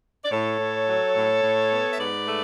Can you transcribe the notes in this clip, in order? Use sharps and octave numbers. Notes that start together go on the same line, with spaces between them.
D5
A2 A4 C#5
A2
F#3
A2
A2
B3
E5
G#2 B4 D5
A3